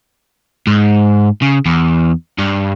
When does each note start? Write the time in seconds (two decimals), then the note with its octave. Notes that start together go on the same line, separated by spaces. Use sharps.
0.67 G#2
1.42 C#3
1.66 E2
2.39 G2